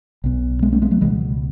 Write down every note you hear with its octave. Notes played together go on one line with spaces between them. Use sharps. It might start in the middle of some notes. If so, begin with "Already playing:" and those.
B1 B2
G#3 B3
A3 C#4
G#3 B3
F#3 A3
C#2 B2 E3 G#3